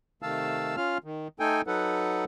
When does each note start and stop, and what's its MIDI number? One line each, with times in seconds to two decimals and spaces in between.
0.22 0.76 48
0.22 0.76 51
0.22 0.76 57
0.22 0.76 77
0.22 0.76 81
0.22 0.76 88
0.77 0.98 61
0.77 0.98 65
0.77 0.98 77
0.77 0.98 89
1.04 1.28 51
1.40 1.62 57
1.40 1.62 63
1.40 1.62 69
1.40 1.62 79
1.40 1.62 80
1.67 2.25 54
1.67 2.25 63
1.67 2.25 69
1.67 2.25 71
1.67 2.25 78